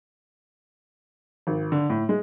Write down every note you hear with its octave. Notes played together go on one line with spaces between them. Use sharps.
G#1
D3
A2
G#3